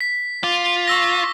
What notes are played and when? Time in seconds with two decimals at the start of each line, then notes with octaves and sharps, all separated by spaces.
0.01 B6
0.44 F4 D6
0.88 C#6 E6 A#6